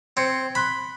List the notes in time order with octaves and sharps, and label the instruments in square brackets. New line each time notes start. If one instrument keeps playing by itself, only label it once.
[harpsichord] C4 [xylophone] G#6 C#7
[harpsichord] B5 [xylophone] C6 F#6 B6